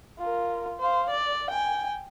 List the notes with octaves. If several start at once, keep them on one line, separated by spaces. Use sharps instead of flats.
F4 A#4
C5 F5
D5
G5 G#5